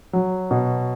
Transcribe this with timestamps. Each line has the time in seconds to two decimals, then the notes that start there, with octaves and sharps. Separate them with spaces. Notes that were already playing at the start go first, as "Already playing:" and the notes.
0.13 F#3
0.51 B2